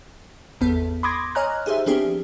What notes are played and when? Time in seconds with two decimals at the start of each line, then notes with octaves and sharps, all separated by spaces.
0.61 G#1 E2 B3 A4
1.03 B5 C6 D6 D#6 G#6 A#6
1.35 C#5 D#5 G#5 A#5 F6 F#6
1.66 D#4 G4 G#4 C5 E5
1.86 F3 B3 C4 D4 G4 G#4